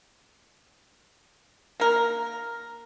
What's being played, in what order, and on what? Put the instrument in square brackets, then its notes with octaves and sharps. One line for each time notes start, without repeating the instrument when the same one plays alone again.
[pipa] A#3 A#4